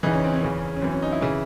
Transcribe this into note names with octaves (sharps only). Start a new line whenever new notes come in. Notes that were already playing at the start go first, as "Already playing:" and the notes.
E2 C#3 E3 D#4
C#4
C4
C#4
E2 C#3 E3
C#4
F#2 E3 C4
C#4
D#4
E4
C#3 E3